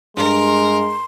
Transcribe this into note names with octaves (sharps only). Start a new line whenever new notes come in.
G2 G#3 A#4 C6